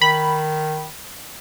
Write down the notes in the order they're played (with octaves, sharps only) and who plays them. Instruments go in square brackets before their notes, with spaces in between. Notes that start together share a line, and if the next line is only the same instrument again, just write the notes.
[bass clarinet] D#3 [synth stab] B5